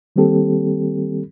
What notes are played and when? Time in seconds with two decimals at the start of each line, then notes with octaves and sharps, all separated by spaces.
0.16 D#3 G3 A#3 C4 G4 A4